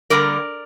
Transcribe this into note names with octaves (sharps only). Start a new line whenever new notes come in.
D3 G3 A#3 A#4 D5